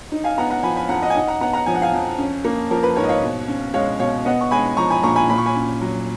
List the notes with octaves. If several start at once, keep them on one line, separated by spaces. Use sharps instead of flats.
D#4
F5 G#5
B3 F#5 A#5
F#5 A#5
F3 G#5 B5
G#5 B5
F2 F#5 A#5
D#5 F#5
G#5
D#4 D#5 F#5
F#5 A#5
B3 F#5 A#5
F#5 A#5
F3 G#5
F#5
F5 G#5
F2
C#4
A#3
F3 A#4
B4
G#2 A#4 C#5
D#5
C#5 F5
B2
C#4
G#3 C#5 F5
B2 C#5 F5
B3 D#5 F#5
C#6
G#3 G#5 B5
F3 A#5 C#6
G#5 B5
A#2 A#5 C#6
G#5 B5
A#2 B5
C#6
G#5 B5
C#4
F#3